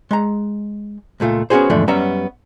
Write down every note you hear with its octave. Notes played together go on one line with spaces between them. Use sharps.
G#3 A#5
C#2 A#2 A3 F4
B3 C#4 F4 F#4 G#4 C5
E2 G#2 D3 F3 A3
F#2 G3 B3 C#4 E5 A#5